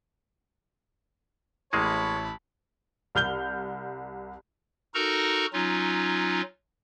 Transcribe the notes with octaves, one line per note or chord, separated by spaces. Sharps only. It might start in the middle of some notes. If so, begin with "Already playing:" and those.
A1 G#3 A#3 E4 G#4 C#5 A5 B5
C2 F6 G6 G7
D#4 F#4 A4 A#4 A#5 C#6
F#3 C#4 D#4 F4